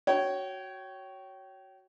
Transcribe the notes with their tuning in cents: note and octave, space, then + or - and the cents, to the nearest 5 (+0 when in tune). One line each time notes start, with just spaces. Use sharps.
F#4 +10 C#5 +0 G5 -25